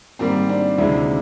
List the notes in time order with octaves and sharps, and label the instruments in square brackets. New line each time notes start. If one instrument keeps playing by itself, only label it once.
[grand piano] G#2 D#3 G3 [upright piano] A#3 C4
[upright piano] C4 D4
[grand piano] D2 C3 D#3 G#3 [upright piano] D4 E4